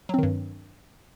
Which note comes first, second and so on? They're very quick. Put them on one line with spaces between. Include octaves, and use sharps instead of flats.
F#3 C4 D#3 G2